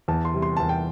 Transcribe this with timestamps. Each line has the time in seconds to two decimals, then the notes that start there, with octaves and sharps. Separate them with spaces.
0.08 E2 A5
0.25 C6
0.34 C3 G3
0.42 C6
0.57 E2 A5
0.69 G5